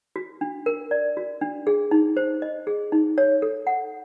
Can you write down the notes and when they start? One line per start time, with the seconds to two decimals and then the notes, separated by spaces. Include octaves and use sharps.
0.16 F#4
0.41 D4
0.66 A#4
0.91 D5
1.17 F#4
1.41 D4
1.67 G#4
1.91 D#4
2.17 C5
2.42 D#5
2.67 G#4
2.92 D#4
3.18 C#5
3.42 A4
3.67 F#5